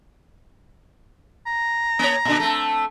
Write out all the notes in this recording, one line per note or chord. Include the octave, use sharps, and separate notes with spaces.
A#5
A#3 C#5
A#2 D3 D4
A3 C4 A4